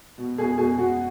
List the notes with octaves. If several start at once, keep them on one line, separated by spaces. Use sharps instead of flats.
B2
B2 G#4
B2 G#4
B2 F#4